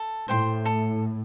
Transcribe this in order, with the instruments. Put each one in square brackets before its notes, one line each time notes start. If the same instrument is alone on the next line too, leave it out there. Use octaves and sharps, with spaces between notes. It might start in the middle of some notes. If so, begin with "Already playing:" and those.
Already playing: [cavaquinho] A4
[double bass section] A2 [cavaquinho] C5 G5 C6
[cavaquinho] A4